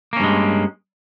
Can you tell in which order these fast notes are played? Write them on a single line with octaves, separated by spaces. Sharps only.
A#3 C#4 G2 G#3